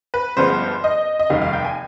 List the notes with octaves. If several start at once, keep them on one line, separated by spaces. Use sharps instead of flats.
B4
G1 G2 F3 G#3 B3 C5
D#5
D#5
F1 D#2 D#3 G3 F5
F5
G5
G#5